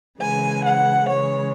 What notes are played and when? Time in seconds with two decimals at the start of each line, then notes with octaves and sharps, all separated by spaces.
0.20 C#3 E3 G#3 G#5
0.65 F#5
1.10 C#3 E3 G#3 C#5